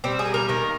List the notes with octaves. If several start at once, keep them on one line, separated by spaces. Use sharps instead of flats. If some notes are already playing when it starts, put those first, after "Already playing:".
G3 C4
G#4
A#3
A#4
D#3 A#4